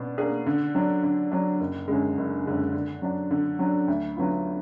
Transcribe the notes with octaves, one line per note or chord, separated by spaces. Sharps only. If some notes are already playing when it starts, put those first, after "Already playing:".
Already playing: B2 D4
A#3 D4 G#4
D3
F#3 D4
D3
F#3 D4
F#1
F#2 D3 G#3
F#1
F#2 D3 G#3
D3
F#3 D4
D3
F#3 D4
D2
D3 F#3 B3 F4